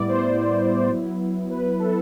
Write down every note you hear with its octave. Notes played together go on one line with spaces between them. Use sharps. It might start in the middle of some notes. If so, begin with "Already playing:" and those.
Already playing: A2 G3 B3 E4 D5
C5
F#3 B3 E4
B4
B4
A4